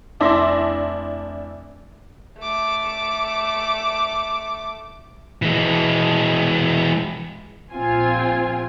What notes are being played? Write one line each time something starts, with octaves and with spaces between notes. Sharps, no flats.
F1 D4 E4 E5 C6 A#6
A3 D6
E3 G#3
A#1 C4 F4 G#5